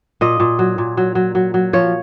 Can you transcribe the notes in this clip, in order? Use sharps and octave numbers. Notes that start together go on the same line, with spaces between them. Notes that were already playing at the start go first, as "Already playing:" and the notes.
A#2 D#5
A#2
F#3
A#2
F#3
F#3
F#3
F#3
F3 C#5